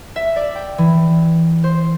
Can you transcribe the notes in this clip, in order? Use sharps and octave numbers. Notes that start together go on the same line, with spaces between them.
E5
D5
G5
E3
C5